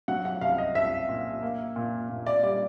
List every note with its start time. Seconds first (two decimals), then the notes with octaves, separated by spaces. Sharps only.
0.08 F#3 F#5
0.25 F#5
0.41 C2 F5
0.58 D#5
0.75 C2 E5
1.09 A#2
1.43 A#3
1.76 A#2
2.10 A#2
2.26 D5
2.43 G3 D5